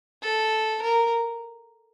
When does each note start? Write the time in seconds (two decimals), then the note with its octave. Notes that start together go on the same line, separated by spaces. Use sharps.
0.23 A4
0.82 A#4